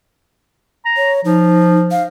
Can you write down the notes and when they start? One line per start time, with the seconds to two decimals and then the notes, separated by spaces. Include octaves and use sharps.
0.85 A#5
0.97 C#5
1.25 F3 D#4
1.91 F5